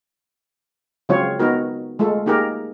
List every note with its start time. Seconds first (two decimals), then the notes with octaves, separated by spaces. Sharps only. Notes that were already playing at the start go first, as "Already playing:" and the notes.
1.09 C#3 F#3 G#3 C4 F4 C#5
1.39 B3 D#4 F#4 A#4
1.99 G#3 A3 F4 A4
2.26 A#3 D#4 G4 G#4 A#4